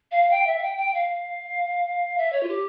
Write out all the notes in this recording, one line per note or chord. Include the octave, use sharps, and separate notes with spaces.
F5
G5
E5
F5
G5
G5
F5
E5
C#5
F4
G4